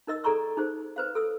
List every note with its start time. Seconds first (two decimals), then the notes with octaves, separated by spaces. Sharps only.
0.07 D#4 A#4 D#5 E6
0.24 G#4 A4 D5 A#5 C#6 E6
0.57 D#4 G#4 C5
0.96 B4 C5 F5
1.15 A4 E6